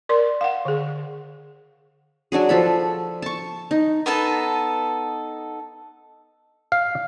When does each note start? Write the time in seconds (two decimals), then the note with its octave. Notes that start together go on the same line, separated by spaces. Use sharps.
0.09 A#4 D5 C6
0.41 F5 F#5
0.65 D3 G#4
2.32 F#3 D4 F#4 G#4
2.49 F3 A4 B5
3.22 A5 C#6
3.71 D#4
4.06 B3 D#4 A4 A5
6.72 F5